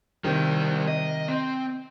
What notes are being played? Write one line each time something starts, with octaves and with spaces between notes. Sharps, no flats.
C3 D#3 G3 C5
D#5
C4